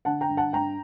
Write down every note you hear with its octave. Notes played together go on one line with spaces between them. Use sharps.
D3 F#5 A5
G5 A#5
G2
F#5 A5
G2 G5 A#5